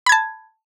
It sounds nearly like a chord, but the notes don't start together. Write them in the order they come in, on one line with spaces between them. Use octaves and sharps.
B5 G#6 A5